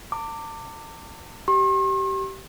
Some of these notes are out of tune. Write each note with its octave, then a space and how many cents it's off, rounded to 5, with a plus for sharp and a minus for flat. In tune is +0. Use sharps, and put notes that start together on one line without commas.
A5 +45 D6 +0
G4 -25 C6 +45